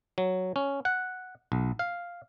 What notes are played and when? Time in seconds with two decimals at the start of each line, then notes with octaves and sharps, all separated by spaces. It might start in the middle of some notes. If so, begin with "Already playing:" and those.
0.18 F#3
0.56 C#4
0.85 F#5
1.52 B1
1.79 F5